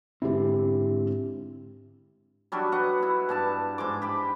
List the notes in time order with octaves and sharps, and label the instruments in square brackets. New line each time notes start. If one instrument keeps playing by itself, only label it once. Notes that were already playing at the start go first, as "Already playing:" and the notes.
[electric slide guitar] G#2 D3 C4 [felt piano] E4 G4
[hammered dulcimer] F#3 G3 D4 F#4
B4 D#5 F#5
E4
G2 D4 A5
G#2 C6 D6
G4 B5